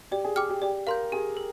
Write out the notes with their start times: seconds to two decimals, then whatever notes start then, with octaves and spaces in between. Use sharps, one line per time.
0.11 G4 D5
0.24 G#4
0.36 G4 G5 D6 F6
0.50 G4
0.62 G4 D5
0.87 A#4 F5 C6 G6
1.12 G4 G#4
1.37 A#4